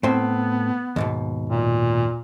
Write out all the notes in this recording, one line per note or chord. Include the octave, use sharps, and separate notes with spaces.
A2 B3 C4
D#2 G#2 B2
A#2